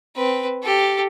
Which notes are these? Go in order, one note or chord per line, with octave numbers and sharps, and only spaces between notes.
C4 B4
G4 A4